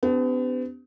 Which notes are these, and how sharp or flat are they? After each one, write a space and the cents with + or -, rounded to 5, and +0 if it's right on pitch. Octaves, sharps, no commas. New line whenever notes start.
B3 +40 D4 -20 G4 +0